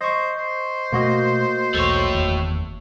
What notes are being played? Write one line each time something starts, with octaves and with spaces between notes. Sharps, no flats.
C5 D#5 C#6
C5
B2 A3 A#3 F#4 D#5
B1 E2 A3 C#5
F#1 E2 D#3